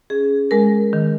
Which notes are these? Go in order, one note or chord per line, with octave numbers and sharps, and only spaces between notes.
C#4 G#4
G#3 A#4
D#3